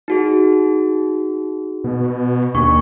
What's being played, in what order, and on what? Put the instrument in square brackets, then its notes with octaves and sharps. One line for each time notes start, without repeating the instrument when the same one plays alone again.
[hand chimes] D#4 F#4 G#4
[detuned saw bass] B2
[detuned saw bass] D#2 [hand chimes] D4 C#6